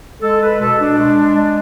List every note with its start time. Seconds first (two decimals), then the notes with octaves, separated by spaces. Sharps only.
0.22 G#3 A4
0.41 B4
0.60 B2 A4
0.79 D4
0.99 G#3
1.36 G#3